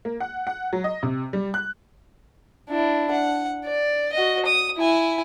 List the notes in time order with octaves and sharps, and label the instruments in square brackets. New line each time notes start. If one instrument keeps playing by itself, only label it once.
[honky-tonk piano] A#3
F#5
F#5
F#3
D#5
C3
G3
F#6
[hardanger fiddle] D4 E4
F#5
D5
F#4 D#5
D#6
E4 G#5